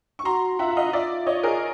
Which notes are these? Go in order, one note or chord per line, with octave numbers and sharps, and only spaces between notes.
C#6
F#4 A#5 C6
F4 E5 F#5
E5
D#5 F5
F4 D5 E5
C#5 D#5
G#4 A#4